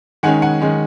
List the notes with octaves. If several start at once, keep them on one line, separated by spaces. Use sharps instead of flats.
D#3 G#3 C#4 F#5 G#5
F#5 G#5
D#3 G#3 C#4